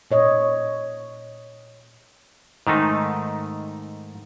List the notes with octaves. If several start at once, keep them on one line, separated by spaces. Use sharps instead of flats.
A#2 C#5 D#5
G#2 D#3 A3 D#4